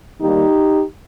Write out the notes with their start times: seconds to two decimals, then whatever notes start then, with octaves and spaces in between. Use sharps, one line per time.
0.20 D#3 G3 A#3 D#4 G4